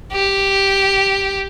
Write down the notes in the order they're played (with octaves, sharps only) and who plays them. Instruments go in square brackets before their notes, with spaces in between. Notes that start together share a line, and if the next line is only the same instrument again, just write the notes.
[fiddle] G4